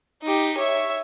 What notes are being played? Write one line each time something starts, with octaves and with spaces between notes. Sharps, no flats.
D#4 G4
C#5 E5